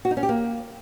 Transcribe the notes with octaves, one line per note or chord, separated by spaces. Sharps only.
F#4
D#4
C#4
G4
A#3